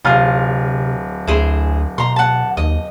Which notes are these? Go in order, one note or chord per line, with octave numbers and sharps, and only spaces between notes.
D1 C3 F4 G#4 F6
D2 E4 G#4 C5
B2 A#5 C6
F#5 A5
D#2 D#5